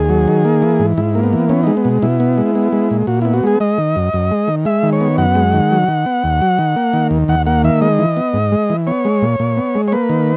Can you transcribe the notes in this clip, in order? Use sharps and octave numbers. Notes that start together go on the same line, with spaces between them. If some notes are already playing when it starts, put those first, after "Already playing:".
Already playing: D#2 G#4
F#3
D#3
A#3
E3
G#2
G#2 E4
A#3
B3
E3
B3 C#4
G#3 D#4
B3
B2
B2 E4
B3
G#3
B3
G#3
A#2
A#2 F#4
B3 E4
F#4
G#3 G#4
G#3 D#5
D#3
F#2
F#2
G#3
D#3
G#3 E5
D#3
C#5
B3
F#2 F#5
G#3
D#3
F#3
D#3
B3
D#2
F#3
D#3
A#3
D#3
D#2
D#2 F#5
A#3 F#5
D#3 E5
G#3 D#5
E3
B3
G#2
G#3
E3
B3 C#5
G#3
A#2
A#2
B3
G#3
C#5
A#3 B4
D#3